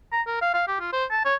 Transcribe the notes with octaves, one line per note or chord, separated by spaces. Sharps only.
A#5
A#4
F5
F5
G4
F4
C5
A5
C#5